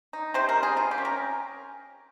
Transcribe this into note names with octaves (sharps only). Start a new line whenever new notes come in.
D#4
C3 C5
A#4
G3
G#4
C3 F4
G4
C#4
A#4